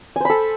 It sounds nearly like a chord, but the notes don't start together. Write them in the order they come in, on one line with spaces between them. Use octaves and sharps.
G#5 C5 B5 A4